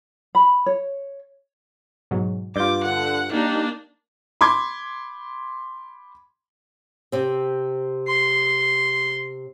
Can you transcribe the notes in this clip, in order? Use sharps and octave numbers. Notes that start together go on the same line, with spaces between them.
B5
C#5
G#2 B2 F#3
G2 F4 D5 D6 G6
D3 F#5
G3 A#3 D4 D#4
B5 C6 D6 G#6
C3 C4
C6